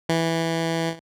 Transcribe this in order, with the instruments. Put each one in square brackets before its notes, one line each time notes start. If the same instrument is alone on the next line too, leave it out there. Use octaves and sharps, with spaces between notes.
[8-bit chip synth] E3